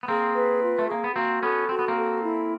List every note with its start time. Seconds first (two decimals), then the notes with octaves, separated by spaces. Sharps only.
0.03 B3
0.08 A#3 C4 G#4
0.34 B4
0.62 F4
0.79 A3
0.88 A#3 G#4
1.04 B3
1.15 A#3 C4 F#4
1.42 B3 C#4 A4
1.69 C4 F#4
1.79 B3
1.88 A#3 C4
1.96 A4
2.23 E4